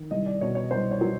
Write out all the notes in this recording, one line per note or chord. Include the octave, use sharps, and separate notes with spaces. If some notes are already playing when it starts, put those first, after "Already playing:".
Already playing: D#3
C2 D#5
D5
B2 C#5
C#5
C2 C5
C#5
F#3